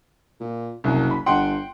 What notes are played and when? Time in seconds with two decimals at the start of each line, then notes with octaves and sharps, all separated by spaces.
0.40 A#2
0.84 F#1 C2
1.11 B5
1.26 G1 F#5 G5 C6